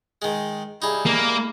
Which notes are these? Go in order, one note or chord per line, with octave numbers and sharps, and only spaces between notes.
D#3 G#3
G3 D#4 E4 G#4
A#3